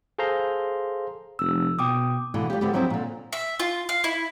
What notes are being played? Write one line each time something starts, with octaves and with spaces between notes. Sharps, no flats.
G#4 A4 C5 F5 A#5 C6
F1 E6
B2 G5 D6 D#6
B2 D3 E3 A#3
G3 D4 F4 G4
D3 F3 B3 F#4 G4
F3 F#3 B3 C4 D#4 E4
A#2 D3
E5
F4
F5
E4